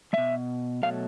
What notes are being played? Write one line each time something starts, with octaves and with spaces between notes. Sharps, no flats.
B2 G#3 E5
B2 F#3 A3 F5